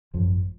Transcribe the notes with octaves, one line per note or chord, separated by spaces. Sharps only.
G#1 F#2 F3